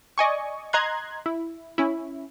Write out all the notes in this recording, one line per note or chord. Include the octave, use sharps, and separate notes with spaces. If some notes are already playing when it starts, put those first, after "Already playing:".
D5 D#5 G#5 C#6
D#5 A#5 C6 F#6 G#6
E4
C#4 E4